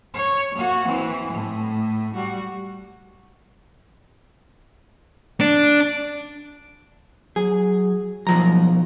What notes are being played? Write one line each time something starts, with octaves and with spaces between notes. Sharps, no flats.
C#5
A#3 F#4
E3 C4
A2 A3
G3 F#4
D4
F#3 G#4
B1 F3 F#3 A#5